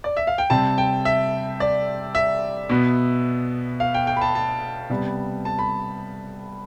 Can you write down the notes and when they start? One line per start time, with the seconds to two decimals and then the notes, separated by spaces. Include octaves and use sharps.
0.04 D5
0.17 E5
0.27 F5
0.38 G5
0.50 C3 G3 C4 A5
0.78 G5
1.05 E5
1.60 D5
2.15 E5
2.69 B2 B3
3.80 F5
3.94 G5
4.07 G5
4.17 B5
4.21 A5
4.35 A5
4.90 C3 G3 B3
5.45 A5
5.59 B5